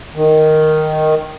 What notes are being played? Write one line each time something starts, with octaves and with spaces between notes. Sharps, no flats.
D#3